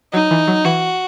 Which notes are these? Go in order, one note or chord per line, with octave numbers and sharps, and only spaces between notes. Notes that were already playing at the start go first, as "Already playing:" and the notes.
F#3 D#4
E3
F#3
E3 F#4